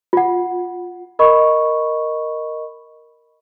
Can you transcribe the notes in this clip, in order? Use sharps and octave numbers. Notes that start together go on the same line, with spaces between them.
F4 F#5
A#4 D#5 B5 C#6